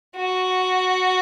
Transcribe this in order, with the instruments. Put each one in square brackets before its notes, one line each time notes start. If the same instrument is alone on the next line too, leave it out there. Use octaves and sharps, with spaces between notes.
[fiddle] F#4